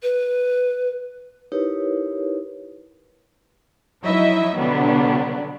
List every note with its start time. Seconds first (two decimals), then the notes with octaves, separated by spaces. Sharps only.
0.03 B4
1.52 D#4 E4 G4 A#4 B4 C#5
4.03 F3 F#3 D#4 E4 D#5 E5
4.58 B2 D3 F#3 G3 B3 D4